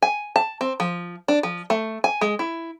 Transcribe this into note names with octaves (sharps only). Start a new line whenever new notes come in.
G#5
A5
C4
F3
D4
F3
A3
G#5
G#3
E4